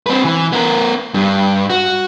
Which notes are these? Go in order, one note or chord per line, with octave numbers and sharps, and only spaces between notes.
C4 B4
E3
B3 A#4
G2
F#4